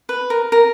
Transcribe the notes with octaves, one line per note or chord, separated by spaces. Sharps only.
B4
A#4
A#4